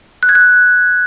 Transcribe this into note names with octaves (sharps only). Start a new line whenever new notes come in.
F#6
G#6
F#6